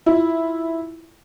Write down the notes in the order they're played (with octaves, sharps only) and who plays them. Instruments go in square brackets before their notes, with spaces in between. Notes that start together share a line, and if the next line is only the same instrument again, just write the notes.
[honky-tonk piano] E4 F4